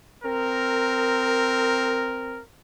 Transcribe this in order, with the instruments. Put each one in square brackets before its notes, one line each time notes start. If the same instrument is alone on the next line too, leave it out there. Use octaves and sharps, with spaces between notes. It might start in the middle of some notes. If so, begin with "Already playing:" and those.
[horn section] C4 A#4